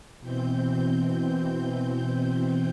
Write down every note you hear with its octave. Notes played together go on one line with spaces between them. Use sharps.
B2 E3 C4 G6